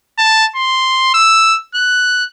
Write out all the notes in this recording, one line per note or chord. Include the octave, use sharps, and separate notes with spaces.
A5
C6
E6
F#6